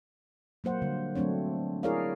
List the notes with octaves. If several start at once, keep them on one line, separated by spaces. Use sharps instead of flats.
F#3 A#3 C5 F#5
D3 G3
F#3 A3 C4 D4 C#5
E4 G#4 A#4 C#5 D5 F5